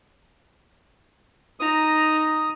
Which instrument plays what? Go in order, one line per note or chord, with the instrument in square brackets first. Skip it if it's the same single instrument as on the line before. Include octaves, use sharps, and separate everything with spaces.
[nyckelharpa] D#4 A#5 [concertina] D#6